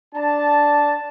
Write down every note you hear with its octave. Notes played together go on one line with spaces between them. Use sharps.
D4 A5